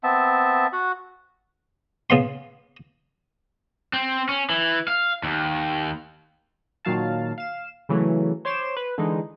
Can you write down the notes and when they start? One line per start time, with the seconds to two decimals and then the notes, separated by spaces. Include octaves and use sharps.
0.04 B3 C4 E5 A5
0.73 F#4 F#5
2.10 C#3 B3 F5 C6
3.93 C4
4.29 C#4
4.50 E3
4.88 F5
5.24 D#2
6.85 A#2 D#3 F#3 F5 A5
7.38 F5 E7
7.89 C#3 E3 F#3 A3
8.45 C5 C#5 C6 D6 E7
8.77 B4
8.98 D3 E3 G#3 D#4